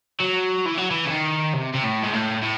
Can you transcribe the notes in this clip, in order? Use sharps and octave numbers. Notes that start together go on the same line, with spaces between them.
F#3
E3
F#3
E3
C#3
D#3
C3
C3
A2
G#2
A2
A2